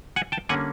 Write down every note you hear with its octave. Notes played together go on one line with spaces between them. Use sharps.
F#5 G#5
G5 A5
D3 G3 A#3 C#4 F#5 G#5